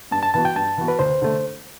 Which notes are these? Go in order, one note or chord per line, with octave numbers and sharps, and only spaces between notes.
G2 A5
A5
E3 B3 F#4 A5
G5
G2 A5
E3 B3 F#4
B4
D2 C5
D3 A3